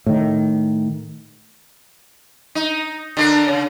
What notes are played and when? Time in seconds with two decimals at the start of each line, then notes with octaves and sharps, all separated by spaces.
0.06 A2 D#3
2.55 D#4
3.17 D3 D4 A#4
3.48 C#3